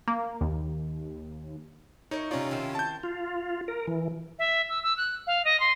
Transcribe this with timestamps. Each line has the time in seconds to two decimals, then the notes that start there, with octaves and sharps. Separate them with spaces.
0.08 A#3
0.41 D#2
2.11 D#4 E4 A#4 C#5
2.31 C3 C#4 F4 A#4 C#5 D5
2.51 D#3 E4 C5
2.75 A5 G6
3.03 F4
3.68 A#4
3.87 E3
4.39 E5
4.69 E6
4.83 E6
4.97 F#6
5.27 F5
5.44 D#5
5.60 C6